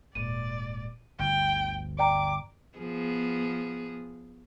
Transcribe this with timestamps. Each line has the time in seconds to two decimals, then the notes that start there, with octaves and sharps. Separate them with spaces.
0.15 D#1 G#2 D5 D#7
1.19 G1 D2 G5
1.99 D5 G5 A#5 D6
2.78 F3 B3 G#4